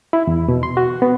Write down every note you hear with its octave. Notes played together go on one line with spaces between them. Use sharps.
E4
E2
B2
C6
F#4
B3